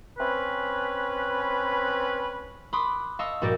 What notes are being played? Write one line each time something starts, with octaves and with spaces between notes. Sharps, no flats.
C4 C#4 B4
B5 C6 D6 D#6 F#6
D#5 F5 A5 C#6 D#6 E6
A#1 G2 A#2 F#4 D5 G6